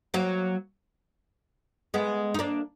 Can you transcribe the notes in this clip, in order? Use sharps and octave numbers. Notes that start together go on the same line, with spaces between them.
F#3 A#3
G#3 B3
D#4
A#3 D4